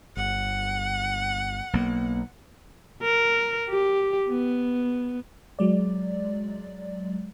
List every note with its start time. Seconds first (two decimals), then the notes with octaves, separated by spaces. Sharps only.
0.17 G1 F#5
1.73 B1 A#3
3.03 A#4
3.69 G4
4.29 B3
5.59 F#3 G#3 D5